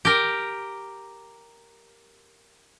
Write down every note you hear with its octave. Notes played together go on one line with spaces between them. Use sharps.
G4 A#4